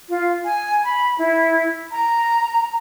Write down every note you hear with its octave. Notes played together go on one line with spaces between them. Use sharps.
F4
G#5
B5
E4
A#5